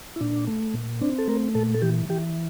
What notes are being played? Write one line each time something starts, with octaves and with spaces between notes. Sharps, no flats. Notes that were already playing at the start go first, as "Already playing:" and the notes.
E4
A#2 D4
A3
A#2
C4 D4
A4
A3 A#4
A#2 A4
A4
E3 G4
E3 G4